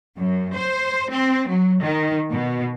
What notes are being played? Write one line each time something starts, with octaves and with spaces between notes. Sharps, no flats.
F#2
C5
C4
F#3
D#3
B2